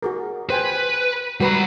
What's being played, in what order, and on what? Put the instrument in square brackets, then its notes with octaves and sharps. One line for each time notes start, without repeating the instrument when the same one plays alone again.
[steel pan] F#4 G#4 A#4
[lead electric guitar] B4 [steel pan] C5 G5 G#5
[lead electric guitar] G3 A#5 [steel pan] F#4 B4